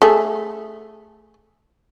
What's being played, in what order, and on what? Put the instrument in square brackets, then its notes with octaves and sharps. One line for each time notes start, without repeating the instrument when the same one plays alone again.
[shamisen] A3 G#4